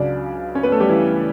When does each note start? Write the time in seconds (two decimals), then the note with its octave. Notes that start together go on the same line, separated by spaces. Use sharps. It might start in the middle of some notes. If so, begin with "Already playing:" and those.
Already playing: C#2 C#3 F#3 D4 D5
0.55 C#4 C#5
0.63 B3 B4
0.72 A3 A4
0.80 G3 G4
0.89 E3 E4